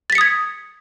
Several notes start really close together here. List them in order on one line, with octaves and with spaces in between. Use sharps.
A6 B6 C#7 D#6 G#6